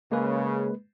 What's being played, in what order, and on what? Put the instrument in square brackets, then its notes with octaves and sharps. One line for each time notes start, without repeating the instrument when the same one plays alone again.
[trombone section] C#3 [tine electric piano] G#3 B4 [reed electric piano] A#3